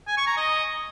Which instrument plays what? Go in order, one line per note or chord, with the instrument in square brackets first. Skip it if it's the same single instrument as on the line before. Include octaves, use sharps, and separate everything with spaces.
[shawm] G#5
C#6
A#5
D#5